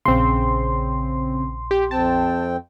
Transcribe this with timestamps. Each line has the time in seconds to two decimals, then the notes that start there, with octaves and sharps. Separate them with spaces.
0.05 A#1 C#3 C4 C6
1.71 G4
1.91 F2 C4 G5 A5